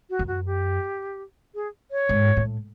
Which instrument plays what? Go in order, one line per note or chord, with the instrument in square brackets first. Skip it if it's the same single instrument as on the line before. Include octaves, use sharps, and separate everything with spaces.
[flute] F#4
[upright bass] F#2
[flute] F#4
G4
G#4
C#5
[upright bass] G#2
A2